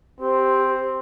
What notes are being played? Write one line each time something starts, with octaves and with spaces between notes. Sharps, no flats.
C4 G4